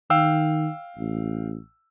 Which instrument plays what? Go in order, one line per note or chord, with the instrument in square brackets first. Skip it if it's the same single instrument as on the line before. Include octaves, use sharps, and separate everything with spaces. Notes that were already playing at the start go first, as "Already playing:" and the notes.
[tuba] D#3 [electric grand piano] F5 G5 E6
[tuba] A1